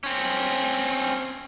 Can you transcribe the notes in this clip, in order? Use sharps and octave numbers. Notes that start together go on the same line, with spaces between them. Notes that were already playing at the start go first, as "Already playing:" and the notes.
C4 C#4